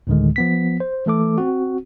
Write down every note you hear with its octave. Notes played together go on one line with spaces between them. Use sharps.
D2 A2 D3 D#3 G#3
F3 B3 B6
C5
E3 A3 A4 D6
C4 F#4